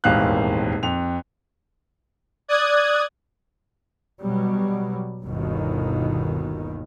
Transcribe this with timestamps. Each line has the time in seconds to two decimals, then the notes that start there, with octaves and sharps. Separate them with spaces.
0.04 D#1 G#1 E2 F5 F#6
0.83 F2 F7
2.48 D5 D#6 F#6 G#6
4.20 B2 F#3 G3
5.23 G1 D#2 B2 D#3